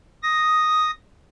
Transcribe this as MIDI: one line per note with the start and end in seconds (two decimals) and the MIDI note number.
0.23 0.91 87
0.23 0.91 94